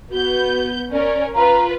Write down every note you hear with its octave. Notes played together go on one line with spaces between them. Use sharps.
B3 F#4 G6
C#4 A#4 D5
F4 B4 A#5